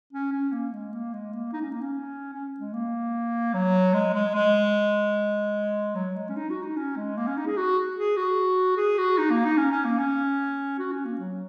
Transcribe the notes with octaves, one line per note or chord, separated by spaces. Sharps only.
C#4
C#4
A#3
G#3
A#3
G#3
A#3
D#4
C#4
A#3
C#4
C#4
G#3
A#3
F#3
G#3
G#3
G#3
F#3
G#3
C#4
D#4
F#4
D#4
C#4
G#3
A#3
C#4
D#4
G#4
F#4
G#4
F#4
G#4
F#4
D#4
A#3
D#4
C#4
C#4
A#3
C#4
F#4
C#4
A#3
F#3